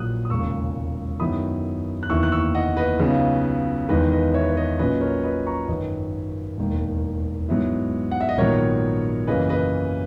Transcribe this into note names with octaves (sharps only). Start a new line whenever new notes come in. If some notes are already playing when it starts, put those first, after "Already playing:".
Already playing: A#1 A#2 F#3 A#3 E4 D#6 F#6
D#6
E1 D#2 C#3 G#3 C#6 E6
F#2 D#3 F#3 B3 E4 B5 D#6
F#6
F#1 E2 D#3 A#3 E4 C#6 E6
F#6
C#6 E6
D#5 F#5
B4 D#5
C#2 C#3 F#3 B3 D#4
E2 D#3 G#3 D#4 B4 D#5
B4 D#5
C#5 E5
B4
C#5
B4 D#5
A#1 A#2 F#3 C#4 B4 D#5
A#4 C#5
B4 D#5
A#5 C#6
G#1 F#2 D#3 B4 D#5
E1 D#2 D#3
G#2 F#3 B3 E4
F#5
E5
D#5
A#1 G#2 D#3 F#3 B3 A#4 C#5
F#2 C#3 E3 A#3 B4 D#5
B4 D#5